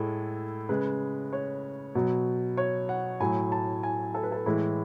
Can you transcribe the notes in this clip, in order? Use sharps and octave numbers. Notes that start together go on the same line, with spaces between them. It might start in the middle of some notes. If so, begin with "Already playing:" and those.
Already playing: A2 G#3 A4
C#3 G#3 B4
C#5
B2 F#3
C#5
F#5
A2 F#3 G#5
A5
G#5
A4
B4
A4
A2 E3 G#3 E4